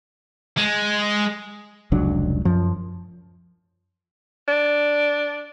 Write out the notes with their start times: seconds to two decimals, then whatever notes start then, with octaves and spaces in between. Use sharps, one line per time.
0.57 G#3
1.92 F1 C#2 F#3 D4
2.45 F#2 F3
4.48 D4